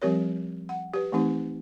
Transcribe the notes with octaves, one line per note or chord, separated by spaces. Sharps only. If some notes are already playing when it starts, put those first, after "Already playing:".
F3 G3 C4 G4 A#4 C#5
F#5
G4 B4
E3 A3 C4 D#4 G4